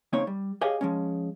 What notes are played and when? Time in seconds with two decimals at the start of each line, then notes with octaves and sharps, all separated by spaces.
0.13 C#3 A#3 C4 C#4 D#4 C#5
0.27 G3
0.61 G4 G#4 C#5 D#5 F5 G#5
0.81 F3 G#3 C#4